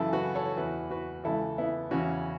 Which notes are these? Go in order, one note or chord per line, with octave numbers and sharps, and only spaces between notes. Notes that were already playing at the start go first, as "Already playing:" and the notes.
Already playing: F#2 C#3 E3 E4 A4
F#4 B4
A4 C#5
E2 E3 F#4 B4
F#4 B4
C#2 C#3 E3 E4 A4
B3 E4
E2 C#3 E3 C#4 F#4